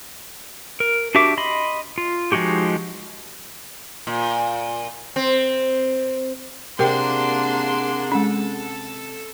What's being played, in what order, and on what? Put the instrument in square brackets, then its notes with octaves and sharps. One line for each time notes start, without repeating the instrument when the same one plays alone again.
[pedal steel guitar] A#4
D4 F#4 G4 E5 D6
D#5 B5 C6
F4
F3 G#3 D#4 F#4 G4
[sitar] A#2
C4
[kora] C3 [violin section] A#3 D4 C6 [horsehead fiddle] G#4 F#5 [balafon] A#4 G5
[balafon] G#3 C#4 [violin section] A4